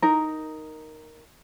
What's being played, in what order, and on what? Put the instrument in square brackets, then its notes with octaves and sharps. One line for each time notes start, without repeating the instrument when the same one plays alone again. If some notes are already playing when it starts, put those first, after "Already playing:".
[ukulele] D#4 A#4